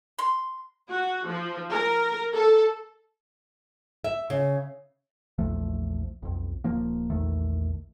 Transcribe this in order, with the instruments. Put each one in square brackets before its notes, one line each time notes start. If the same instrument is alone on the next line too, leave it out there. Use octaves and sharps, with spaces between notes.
[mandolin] C6
[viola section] F#4
F3
A#4
A4
[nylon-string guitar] E5
C#3
[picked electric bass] A#1 E2 F3 A3
B1 F2
D#1 F3 A#3
A#1 E2 D#3 A3